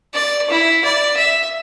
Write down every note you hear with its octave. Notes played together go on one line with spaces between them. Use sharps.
D5
E4
D5
E5